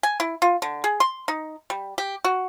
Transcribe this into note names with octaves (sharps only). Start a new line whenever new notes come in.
G#5
E4
F4
D3
G#4
C6
D#4
G3
G4
F#4